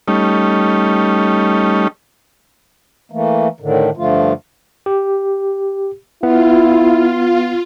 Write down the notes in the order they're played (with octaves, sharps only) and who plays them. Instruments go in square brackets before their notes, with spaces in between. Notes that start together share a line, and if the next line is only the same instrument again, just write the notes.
[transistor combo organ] G3 A3 C#4 D#4
[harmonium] E3 A3 A#3
A2 D3 D#3
G2 D3 F3 A3 F4
[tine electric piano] G4
[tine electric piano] B3 [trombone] E4 [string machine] F4